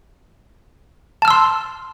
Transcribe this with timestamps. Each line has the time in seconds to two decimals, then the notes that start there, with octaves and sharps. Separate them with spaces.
1.22 A5
1.25 F6
1.28 E6
1.30 C6